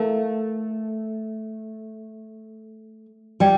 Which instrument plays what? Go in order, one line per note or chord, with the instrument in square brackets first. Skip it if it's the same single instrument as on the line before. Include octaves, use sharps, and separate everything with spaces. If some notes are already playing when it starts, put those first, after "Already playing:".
Already playing: [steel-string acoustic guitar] A3 [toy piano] E4 A#4 F5 A5
[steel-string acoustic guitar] G3 [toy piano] D5 G5